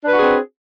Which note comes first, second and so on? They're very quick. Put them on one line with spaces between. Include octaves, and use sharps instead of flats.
D4 B4 F#4 G#4 C4